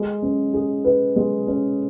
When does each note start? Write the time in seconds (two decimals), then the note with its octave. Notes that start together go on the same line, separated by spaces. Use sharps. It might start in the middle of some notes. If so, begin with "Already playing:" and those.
Already playing: G#3
0.22 C#4
0.53 G#4
0.85 B4
1.16 G#3
1.47 C#4